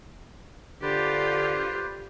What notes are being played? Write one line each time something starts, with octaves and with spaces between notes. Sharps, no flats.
D3 F4 G4 B4 C5 D5